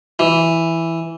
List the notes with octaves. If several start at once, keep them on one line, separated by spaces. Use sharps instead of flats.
E3